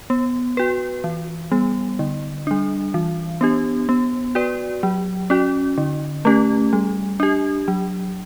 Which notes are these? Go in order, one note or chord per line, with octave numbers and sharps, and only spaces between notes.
B3
F#4 B4
E3
G3 B3
D3
G3 D4
E3
B3 D4 G4
B3
F#4 B4 D5
F#3
C#4 F#4
D3
A3 C#4 G4
G3
D4 G4
F#3